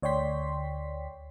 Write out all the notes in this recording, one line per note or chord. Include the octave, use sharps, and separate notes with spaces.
D2 C#5 D5 G5 C6 B6